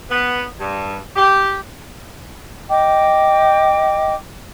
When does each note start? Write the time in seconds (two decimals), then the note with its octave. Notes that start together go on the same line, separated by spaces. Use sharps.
0.10 B3
0.59 G2
1.16 G4
2.69 D#5 G5 D6